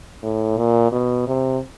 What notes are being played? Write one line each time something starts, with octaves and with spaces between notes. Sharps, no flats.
A2
A#2
B2
C3